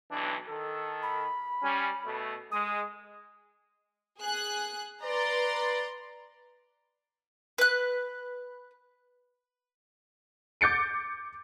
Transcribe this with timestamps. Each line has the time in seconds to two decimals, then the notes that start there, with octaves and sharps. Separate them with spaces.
0.11 B1 E3 D4
0.49 D#3 A4
1.03 B5
1.63 G3 C#4
2.05 B2 A3
2.52 G#3 D#6
4.20 G#4 F#6
5.03 B4 D5 A#5 C6
7.58 B4 F#6
10.61 D6 G6 A6 C#7 D7